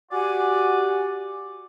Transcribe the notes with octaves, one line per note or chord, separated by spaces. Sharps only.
F#4 G4 D5 F#5 G#5